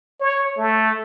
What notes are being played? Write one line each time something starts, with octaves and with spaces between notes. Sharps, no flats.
C#5
A3